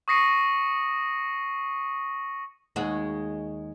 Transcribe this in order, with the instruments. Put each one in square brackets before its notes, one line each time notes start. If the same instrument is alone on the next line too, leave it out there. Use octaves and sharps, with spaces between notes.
[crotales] C#6 D#6 A#6 C7 C#7 D#7
[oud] D#2 G#3 F#4